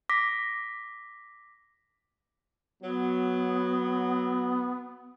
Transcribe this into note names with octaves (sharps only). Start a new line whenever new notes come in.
D6 A#6 B6
F#3 B3